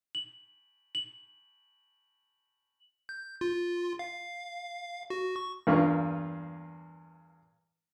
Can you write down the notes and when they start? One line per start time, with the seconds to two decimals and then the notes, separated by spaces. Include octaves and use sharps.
0.15 F#7
0.95 F#7
3.09 G6
3.41 F4
3.99 F5
5.10 F#4
5.36 C#6
5.67 E2 G2 A#3 F4 C#6